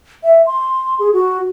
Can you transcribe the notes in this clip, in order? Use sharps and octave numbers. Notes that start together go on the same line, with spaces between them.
E5
C6
G#4
F#4